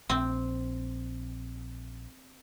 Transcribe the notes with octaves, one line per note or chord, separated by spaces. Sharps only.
A#1 C4